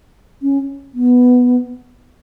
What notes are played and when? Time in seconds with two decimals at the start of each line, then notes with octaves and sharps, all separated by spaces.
0.42 C#4
0.94 B3